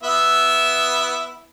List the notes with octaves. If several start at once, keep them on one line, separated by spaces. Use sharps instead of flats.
B3 E4 E5